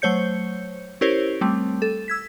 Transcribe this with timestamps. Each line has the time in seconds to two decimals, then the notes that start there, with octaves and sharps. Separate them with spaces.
0.02 F#3 A3 C5 C#5 G6 C#7
1.01 C#4 E4 G4 A#4 C5 C#5
1.41 G3 A3 C4
1.82 A4
2.08 E6 G#6 B6